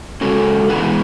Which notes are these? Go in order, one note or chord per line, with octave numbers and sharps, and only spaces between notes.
C#3 G#3 C#4 F#4 A4
E2 C#3 G#3 B3 E4 G#4